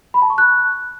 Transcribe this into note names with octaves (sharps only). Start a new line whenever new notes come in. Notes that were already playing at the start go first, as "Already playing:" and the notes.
B5
A5
C#6
F#6